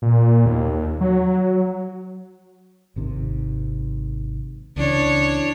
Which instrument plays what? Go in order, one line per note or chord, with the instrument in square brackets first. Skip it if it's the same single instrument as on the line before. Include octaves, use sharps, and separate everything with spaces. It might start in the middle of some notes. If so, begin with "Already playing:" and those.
[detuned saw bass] A#2
D#2
F#3
[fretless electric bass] G#1 C3 D#3
[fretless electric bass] C#2 C#3 E3 [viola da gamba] D4 C#5